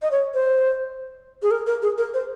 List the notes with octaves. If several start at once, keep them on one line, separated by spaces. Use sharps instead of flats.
D#5
C#5
C5
G#4
A#4
A#4
G#4
A#4
C5